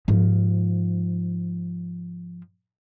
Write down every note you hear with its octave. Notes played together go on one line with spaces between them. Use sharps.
G#2 F3